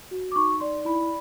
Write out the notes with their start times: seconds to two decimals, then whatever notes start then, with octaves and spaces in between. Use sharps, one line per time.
0.11 F#4
0.32 D6
0.36 D#4 C#6
0.60 D5 C6
0.85 E4 B5